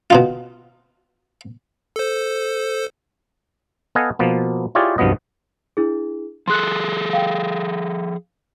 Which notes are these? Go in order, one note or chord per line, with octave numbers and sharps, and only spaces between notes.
B2 D#4 F4
A4 C5
B3 A4 D#5 F5 F#5 G#5
B2 F3 A#3 B3
E4 F4 G4 G#4 C#5 D5
C2 G2 F3 F#3 B3 D#5
D4 E4 G#4
F3 G#4 A4 C6 F#6
F5 G5